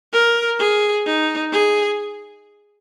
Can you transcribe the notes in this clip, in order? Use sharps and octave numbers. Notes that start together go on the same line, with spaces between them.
A#4
G#4
D#4
G#4